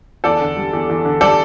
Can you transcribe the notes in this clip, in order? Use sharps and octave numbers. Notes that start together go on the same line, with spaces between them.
E2 A4 D5
D3
G3
E2
E2
D3
G3 A4 D5